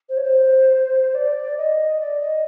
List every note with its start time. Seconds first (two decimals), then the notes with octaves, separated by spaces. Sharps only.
0.09 C5
0.17 C#5
0.23 C5
1.15 D5
1.58 D#5
2.00 D5
2.21 D#5